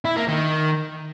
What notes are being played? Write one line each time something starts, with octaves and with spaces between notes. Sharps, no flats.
E4
A#3
D#3